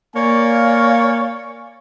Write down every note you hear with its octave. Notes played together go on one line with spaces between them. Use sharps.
A#3 C#5 D5 F5 G#5